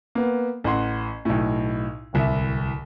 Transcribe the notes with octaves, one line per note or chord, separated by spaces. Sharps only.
A#3 B3
A1 F#5 C6
B1 A2
D1 C2 E5